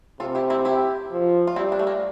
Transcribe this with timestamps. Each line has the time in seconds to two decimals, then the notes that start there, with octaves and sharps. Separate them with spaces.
0.20 C3 F4 A4
0.35 E4 G4
0.50 C4 E4
0.65 E4 G4
1.11 F3
1.47 F4
1.56 G3 C4 E4
1.72 D4
1.79 A3
1.87 A#3